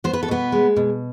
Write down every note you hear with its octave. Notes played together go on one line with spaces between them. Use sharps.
B3 C5
B4
A4
B2 B3 B4
G#3
B2